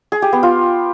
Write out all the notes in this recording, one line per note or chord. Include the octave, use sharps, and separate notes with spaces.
G#4
G4
B3
F4